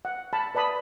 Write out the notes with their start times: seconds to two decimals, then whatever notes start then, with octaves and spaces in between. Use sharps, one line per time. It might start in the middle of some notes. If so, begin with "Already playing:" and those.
0.05 F#5
0.33 A5 B5
0.55 B4 D5 A5 B5 D#6